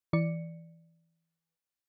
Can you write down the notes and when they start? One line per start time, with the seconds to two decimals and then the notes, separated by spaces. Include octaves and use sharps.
0.13 E3 D5 C#7